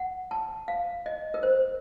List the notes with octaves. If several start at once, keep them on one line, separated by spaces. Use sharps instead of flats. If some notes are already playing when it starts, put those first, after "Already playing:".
Already playing: F#5
A5
F5
D#5
A#4
C5